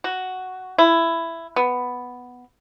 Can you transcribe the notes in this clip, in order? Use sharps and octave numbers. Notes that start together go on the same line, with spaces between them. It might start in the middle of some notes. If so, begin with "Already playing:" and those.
F#4
E4
B3